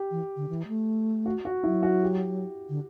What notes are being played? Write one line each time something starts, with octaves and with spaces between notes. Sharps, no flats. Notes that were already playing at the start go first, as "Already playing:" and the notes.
Already playing: G4
E3
D3
E3
A3
F#4
F#4
F#3 E4
F#4
G4
D3